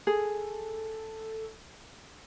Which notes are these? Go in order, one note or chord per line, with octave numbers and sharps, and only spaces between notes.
G#4 A4